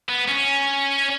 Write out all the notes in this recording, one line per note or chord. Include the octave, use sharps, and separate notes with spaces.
B3
C#4